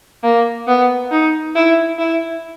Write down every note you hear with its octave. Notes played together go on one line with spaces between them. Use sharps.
A#3
B3
D#4
E4
E4